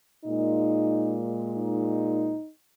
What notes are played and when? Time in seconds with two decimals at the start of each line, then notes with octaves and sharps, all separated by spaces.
0.24 A#2 G#3 D#4
1.56 D#4